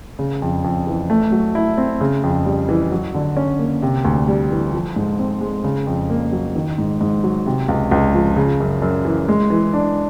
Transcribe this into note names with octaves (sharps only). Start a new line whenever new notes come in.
C#3
F2
F2
E3
A3
F#3
E4
C4
C#3
F2
G3
E3
F#3
D3
C#4
A#3
C3
D2
G3
E3
F3
G#2
C4
G#3
C#3
F2
A#3
F#3
D#3
G#2
G#2
F#3
C3
C#2
C#2
F3
C#3
F#2
F#2
E3
G#3
E3
D4